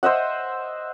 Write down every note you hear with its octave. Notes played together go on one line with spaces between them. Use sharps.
C5 D#5 E5 F#5